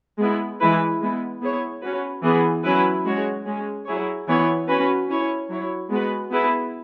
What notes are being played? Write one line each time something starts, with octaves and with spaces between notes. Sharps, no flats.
G#3 B3 E4
E3 G#3 E4 B4
G#3 B3 E4
B3 E4 G#4 C#5
C#4 F#4 B4
E3 B3 G#4
F#3 C#4 E4 B4
G#3 C#4 F#4 C#5
G#3 C#4 G#4
F#3 E4 G#4 C#5
E3 B3 E4 C#5
C#4 F#4 B4
C#4 E4 C#5
F#3 E4 C#5
G#3 B3 F#4 B4
B3 E4 G#4 B4